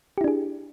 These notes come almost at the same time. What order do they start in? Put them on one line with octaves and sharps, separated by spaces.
G4 E4 D4 G#4